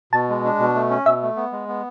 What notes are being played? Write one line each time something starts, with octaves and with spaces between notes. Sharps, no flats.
B2 A5
G#3
D4
B2
A3
C#4
B2 E5
A3
B3
G#3
B3